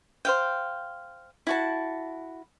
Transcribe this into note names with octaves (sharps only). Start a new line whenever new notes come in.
C5 F5 G5
E4 F#4 A5